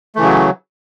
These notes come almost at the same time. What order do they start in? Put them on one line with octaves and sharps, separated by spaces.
A3 E3 C#3 F#3